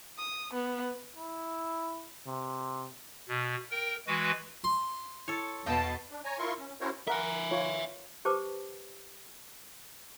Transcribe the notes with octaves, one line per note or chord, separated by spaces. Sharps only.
D#6
B3
E4
C3
B2
A#4 G5
E3 G#3 F#4 B4
C6
E4 A4 C#5
E2 B2 B4 D#5 G5 A5
D4
C#5 G#5 A#5
E4 F4 A#4 C6 C#6
C#4
C#4 E4 F#4 A#4 C5 C#5
A#4 E5 F#5 G#5
F4 C#5
G4 B4 C5 A5 D6